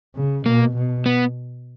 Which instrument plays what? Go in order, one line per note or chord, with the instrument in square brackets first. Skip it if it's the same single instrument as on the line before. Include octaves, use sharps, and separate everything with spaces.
[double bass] C#3
[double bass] B2 [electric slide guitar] A#3
[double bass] B2
[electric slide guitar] B3